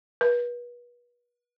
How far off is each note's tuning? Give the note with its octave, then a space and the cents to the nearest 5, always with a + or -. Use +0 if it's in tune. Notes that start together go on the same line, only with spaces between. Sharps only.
B4 -35